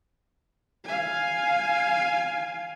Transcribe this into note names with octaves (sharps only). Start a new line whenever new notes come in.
F5 G#5